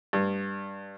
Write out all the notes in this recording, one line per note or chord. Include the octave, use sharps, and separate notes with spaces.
G2